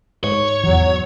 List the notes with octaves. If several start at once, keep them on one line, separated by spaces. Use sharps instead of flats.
G#2 C#5
E2 E3 F#3